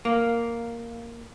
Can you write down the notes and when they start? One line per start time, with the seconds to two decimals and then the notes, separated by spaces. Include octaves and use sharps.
0.05 A#3